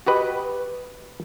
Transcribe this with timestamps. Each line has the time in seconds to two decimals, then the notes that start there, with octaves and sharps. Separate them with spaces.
0.07 F#4 G4 B4 D#5